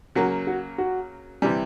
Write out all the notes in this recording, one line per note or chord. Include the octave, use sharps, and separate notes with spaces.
C#3 F#3 A#3 F#4
F#4
F#4
C3 E3 G3